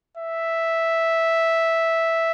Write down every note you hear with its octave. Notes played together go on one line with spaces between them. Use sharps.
E5